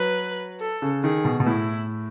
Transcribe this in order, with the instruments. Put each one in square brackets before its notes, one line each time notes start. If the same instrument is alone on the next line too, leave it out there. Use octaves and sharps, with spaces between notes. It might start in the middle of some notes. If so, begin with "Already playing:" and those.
Already playing: [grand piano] F#3 [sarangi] B4
[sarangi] A4
[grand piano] C#3
[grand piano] D#3 [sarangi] G#4
[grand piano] B2
B2
[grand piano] A2 [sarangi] E4